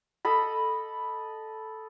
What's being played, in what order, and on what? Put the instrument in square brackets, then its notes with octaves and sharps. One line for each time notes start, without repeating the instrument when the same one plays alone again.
[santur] A4 D#5 B5